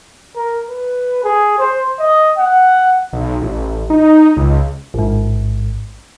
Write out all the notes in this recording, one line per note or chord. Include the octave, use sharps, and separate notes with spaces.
A#4
B4
G#4
C5
D#5
F#5
B1
A1
D#4
C#2
A1 G#2